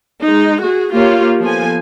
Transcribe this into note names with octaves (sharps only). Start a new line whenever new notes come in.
G#3 D#4
F#4 G#4
A#3 F4 G4 C#5
F3 B3 A4 G#5